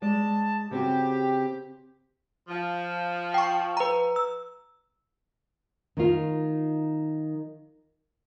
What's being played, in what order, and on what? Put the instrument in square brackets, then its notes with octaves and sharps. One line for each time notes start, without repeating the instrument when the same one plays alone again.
[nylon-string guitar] G#3 D5 [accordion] A5
[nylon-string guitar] C#3 C4 F#4 [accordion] G4
[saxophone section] F3
[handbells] G5 C#6
B4 A#5
E6
[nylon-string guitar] D#3 D#4 F4